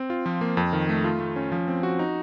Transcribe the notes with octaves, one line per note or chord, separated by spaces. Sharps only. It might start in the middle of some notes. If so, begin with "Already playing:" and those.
Already playing: C4
F4
F3
A#3
F2
D#3
A3
F4
A3
C#4
F3
C4
F#4
D#4